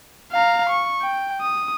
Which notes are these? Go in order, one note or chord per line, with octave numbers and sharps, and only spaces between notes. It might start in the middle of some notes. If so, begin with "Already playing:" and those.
F5 A#5
C#6
G5
D#6